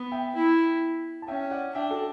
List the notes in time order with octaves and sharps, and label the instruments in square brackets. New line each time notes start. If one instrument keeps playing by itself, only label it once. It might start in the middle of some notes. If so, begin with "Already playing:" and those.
Already playing: [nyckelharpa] B3
[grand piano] E5 G5
[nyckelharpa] E4
[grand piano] A5
[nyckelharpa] C#4 [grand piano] E5 G5
[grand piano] D5 F#5
[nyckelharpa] D4 [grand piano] E5 G5
[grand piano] F#4 A4